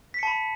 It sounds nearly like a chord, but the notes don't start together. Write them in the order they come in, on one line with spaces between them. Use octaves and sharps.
B6 C#7 A5 B5